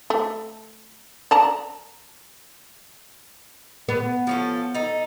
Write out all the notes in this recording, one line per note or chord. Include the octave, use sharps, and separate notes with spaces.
A3
D5 A5 A#5
B3
F3 C#4 A4
D#4 A4